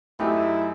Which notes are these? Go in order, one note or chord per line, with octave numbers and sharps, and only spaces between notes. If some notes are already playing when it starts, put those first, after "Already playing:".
F#2 F#3 A3 D#4 E4 G4